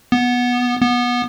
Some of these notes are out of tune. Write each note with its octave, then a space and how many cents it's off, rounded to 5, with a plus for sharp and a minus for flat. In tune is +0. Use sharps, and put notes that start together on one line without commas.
B3 -10
B3 -20